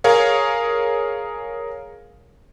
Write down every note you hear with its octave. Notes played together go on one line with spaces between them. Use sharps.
G#4 A#4 C#5 F5